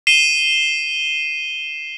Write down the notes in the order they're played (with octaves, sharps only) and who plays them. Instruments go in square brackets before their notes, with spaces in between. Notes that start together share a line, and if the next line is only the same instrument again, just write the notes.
[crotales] C7 D#7 E7 G7